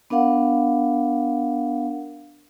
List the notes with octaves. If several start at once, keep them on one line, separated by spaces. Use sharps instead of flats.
B3 D4 A#4 F5 F#5